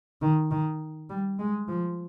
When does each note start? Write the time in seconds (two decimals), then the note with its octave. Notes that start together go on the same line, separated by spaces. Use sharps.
0.22 D#3
0.51 D#3
1.10 G3
1.39 G#3
1.68 F3